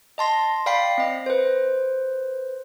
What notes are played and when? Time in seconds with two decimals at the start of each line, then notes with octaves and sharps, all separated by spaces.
0.18 D#5 A5 C6 A#6
0.66 D5 F5 G5 B5 B6 C7
0.98 C4 D#5
1.26 B4 C5